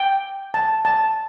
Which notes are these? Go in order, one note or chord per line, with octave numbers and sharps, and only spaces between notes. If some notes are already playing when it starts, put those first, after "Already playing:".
Already playing: G5
A5
A5